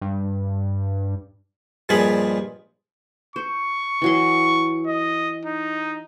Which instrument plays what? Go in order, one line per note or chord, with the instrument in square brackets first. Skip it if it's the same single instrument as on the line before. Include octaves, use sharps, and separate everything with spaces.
[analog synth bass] G2
[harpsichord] G2 A#2 F3 G#3 G#4 B5
[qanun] C5 [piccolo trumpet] C#6
[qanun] E3 F#3 C6
[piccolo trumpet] D#5
D#4